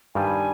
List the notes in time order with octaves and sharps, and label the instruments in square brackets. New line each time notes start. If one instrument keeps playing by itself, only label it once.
[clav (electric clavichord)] G2 D#3 G3 [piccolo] G#5